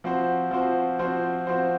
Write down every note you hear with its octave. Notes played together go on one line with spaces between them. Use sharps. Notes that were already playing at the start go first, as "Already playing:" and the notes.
F3 C4 F#4 C5
F3 C4 F#4 C5
F3 C4 F#4 C5
F3 C4 F#4 C5